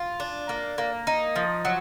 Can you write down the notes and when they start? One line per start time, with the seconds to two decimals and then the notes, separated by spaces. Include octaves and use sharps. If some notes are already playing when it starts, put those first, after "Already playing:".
Already playing: F4
0.20 D4
0.49 A#3
0.78 A#3
1.07 D#4
1.36 F3
1.65 F#3